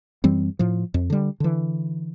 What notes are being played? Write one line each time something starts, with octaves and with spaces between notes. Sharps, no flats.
F#2 E3 G3 C4
A2 F3
F2
D3 G3
D3 E3